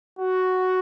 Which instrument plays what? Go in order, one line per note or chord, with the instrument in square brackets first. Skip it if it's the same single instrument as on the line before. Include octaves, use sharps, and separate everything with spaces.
[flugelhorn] F#4